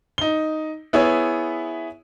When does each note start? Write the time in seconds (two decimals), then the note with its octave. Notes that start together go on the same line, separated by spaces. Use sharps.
0.18 D#4 G7
0.93 B3 E4 G#4 C#5